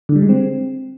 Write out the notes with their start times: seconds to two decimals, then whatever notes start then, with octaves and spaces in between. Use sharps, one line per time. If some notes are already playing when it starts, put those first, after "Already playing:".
0.09 D3
0.16 G3
0.22 G#3
0.29 C4